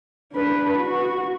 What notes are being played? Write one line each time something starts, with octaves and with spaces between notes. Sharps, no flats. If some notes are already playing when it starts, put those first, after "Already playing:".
D4 B4
F#4